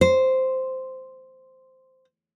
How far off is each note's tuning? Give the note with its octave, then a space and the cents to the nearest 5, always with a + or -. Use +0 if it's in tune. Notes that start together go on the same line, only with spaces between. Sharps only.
C5 -5